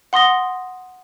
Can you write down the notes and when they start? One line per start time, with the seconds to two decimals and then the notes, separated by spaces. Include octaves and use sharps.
0.13 F#5 C6 D#6 A#6 G7